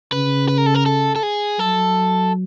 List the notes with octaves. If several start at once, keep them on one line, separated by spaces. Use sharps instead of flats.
C#3 B4
B4
A#4
A4
A#4
A4
A4
G#4
F#3 A4